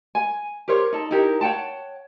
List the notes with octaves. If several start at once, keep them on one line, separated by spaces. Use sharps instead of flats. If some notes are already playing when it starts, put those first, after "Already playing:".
G#5
G4 A#4 C5 C#5
D#4 A4
D#4 E4 G4 A#4
C#5 F#5 G5 A5